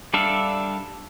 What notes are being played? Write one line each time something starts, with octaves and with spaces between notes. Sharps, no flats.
G3 D4 A4 E5 F5